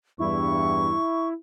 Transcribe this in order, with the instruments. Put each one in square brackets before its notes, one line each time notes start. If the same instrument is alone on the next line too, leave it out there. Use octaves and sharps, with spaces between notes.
[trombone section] E2 G2 [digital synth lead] E4 [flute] C#6